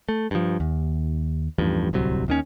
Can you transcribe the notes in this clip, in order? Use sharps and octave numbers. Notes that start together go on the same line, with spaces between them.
A3
G2 F3
D#2
A1 E2 G2 F3
D1 C2 C3 F#3
D#2 D#3 C#4